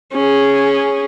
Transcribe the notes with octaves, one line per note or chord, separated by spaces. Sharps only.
C#4 G#4